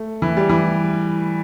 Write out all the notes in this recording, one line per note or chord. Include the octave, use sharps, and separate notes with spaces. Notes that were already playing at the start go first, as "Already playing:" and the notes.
Already playing: A3
E3
G3
E3